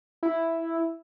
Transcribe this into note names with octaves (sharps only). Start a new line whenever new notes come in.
E4